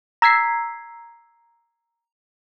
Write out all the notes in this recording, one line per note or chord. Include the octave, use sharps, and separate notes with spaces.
A#5 E6 G#6 B6 C7